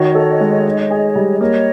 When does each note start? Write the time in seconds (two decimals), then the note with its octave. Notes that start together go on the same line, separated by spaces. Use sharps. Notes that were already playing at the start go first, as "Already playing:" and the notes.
Already playing: D#3 F#4 C#5 D#5
0.15 A4
0.40 G#3
0.65 D#4
0.90 G#4
1.16 G3
1.40 A#3 C#5 D#5